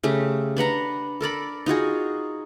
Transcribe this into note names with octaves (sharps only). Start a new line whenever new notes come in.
C#3 A3 G4
D4 B4 F#5 A#5
A4 A#4 D5 B5
D#4 F4 F#4 G#4